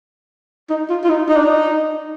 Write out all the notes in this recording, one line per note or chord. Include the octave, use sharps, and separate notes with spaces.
D#4
F4
F4
D#4
D#4
D4
D#4